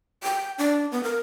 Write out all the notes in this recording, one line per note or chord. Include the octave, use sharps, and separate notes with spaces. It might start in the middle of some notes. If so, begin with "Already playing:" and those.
G5
D4
B3
A#4